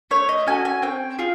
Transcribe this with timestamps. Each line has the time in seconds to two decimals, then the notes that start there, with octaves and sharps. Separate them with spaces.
0.11 A3 C#5
0.29 D#5
0.47 C#4 F#4 A4 G#5
0.65 G#5
0.82 C4 G5
1.19 F4 G#4